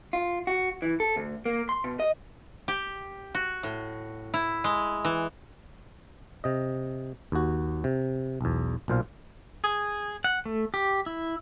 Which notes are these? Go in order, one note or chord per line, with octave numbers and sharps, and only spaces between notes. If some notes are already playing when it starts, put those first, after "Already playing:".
F4
F#4
E3
A4
D2
A#3
C6
B2
D#5
G4
F#4
A2
E4
G#3
E3
C3 D#5
D#2 F#4
C3
B1 E2
B1 A#2 C5 F5
G#4
F#5
A3
G4
E4